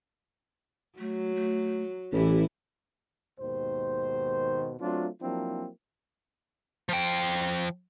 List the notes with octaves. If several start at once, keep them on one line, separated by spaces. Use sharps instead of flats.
F#3 A3
A3
A1 A2 E3 E4 G4
D#2 G#2 B2 D#3 C5
F#3 A3 C4 D4 F4
F3 F#3 A#3 C4 D4 E4
F3 G5